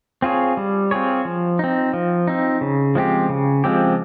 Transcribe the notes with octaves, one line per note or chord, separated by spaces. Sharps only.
C4 F4 G#4 C#5
G3
C4 F4 G#4 C#5
F3
C4 D#4
F3
C4 D#4
C#3
F3 G#3 C4 G4
C#3
F3 G#3 C4 G4